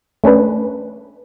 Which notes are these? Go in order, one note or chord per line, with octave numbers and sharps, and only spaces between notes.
A3 C#4 D4 B4